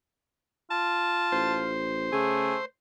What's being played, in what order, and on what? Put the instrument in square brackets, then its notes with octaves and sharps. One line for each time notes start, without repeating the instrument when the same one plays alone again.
[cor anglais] F4 [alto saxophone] A5
[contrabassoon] A1 [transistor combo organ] C5
[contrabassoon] C#3 [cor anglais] A3 [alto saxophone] G#4